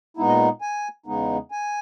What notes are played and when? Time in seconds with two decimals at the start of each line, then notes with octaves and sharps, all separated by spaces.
0.17 A#2 G#3 B3 D#4 E4
0.28 D#5
0.61 G#5
1.06 E2 C#3 G#3 B3 D#4
1.51 G#5